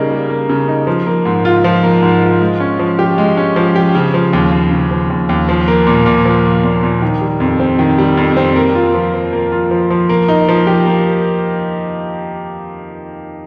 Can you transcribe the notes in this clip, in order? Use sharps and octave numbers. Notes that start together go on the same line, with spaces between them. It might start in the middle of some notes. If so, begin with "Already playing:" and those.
Already playing: C#3 G3 A#3 D#4
G3
A#3
C#3
D#4
F3
A#3
G#2
F4
F3
A#3
G#2
F4
G#3
C#4
F3
G4
G#3
C#4
F3
G4
C#3
F3
D#2
D#2
C#3
F3
D#2
D#2
F3
A#3
A#2
A#2
F3
A#3
A#2
A#2
D#3
G3
F2
C4
D#3
G3
F2
C4
A#3
F4
F3
F3
A#3
F4
F3
F3
A#3
D#4
F3
G4
A#3